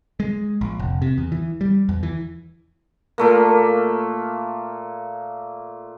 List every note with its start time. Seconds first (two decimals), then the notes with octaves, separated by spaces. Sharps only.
0.20 G#3
0.61 A#1
0.79 F1
1.02 C3
1.18 E2
1.32 E3
1.61 G3
1.89 E2
2.03 E3
3.18 A#2 A3 A#3